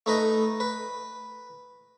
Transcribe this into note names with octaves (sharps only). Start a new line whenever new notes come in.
A3 D#4 B4 D#5
B4